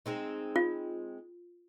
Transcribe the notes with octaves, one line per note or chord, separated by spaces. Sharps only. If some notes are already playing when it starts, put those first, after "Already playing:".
G#3 C4 D#4
F4